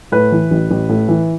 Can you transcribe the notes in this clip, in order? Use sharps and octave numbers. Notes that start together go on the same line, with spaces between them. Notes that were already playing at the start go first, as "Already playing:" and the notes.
A2 B4
E3
A1
A1
A2
E3